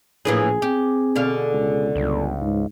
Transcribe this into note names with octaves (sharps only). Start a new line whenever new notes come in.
A#1 A2 E3 A#3 G#4
C4 G4
B2 D3 F5
C#2
G1 C#2
G#2